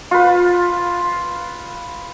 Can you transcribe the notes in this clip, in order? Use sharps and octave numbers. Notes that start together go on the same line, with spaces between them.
F4 B4